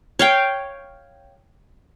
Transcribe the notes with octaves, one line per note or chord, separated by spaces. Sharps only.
C#5 F5 G5